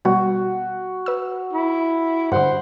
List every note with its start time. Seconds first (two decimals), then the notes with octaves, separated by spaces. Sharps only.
0.05 B2 G3 F#4
1.06 B4 E6
1.53 E4
2.32 G2 D3 C5 F#5